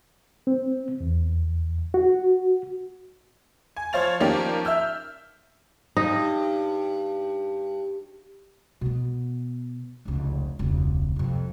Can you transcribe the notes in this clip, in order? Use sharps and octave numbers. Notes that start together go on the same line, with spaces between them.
C4
E2
F#4
G#5
F3 C5 C#5 F5 A6 F7
D#3 F3 A#3 C#4 G4 D5
E5 E6 F6 G6
G2 D#4
B2 B3
F1 C#2
E1 C#2
F2 C3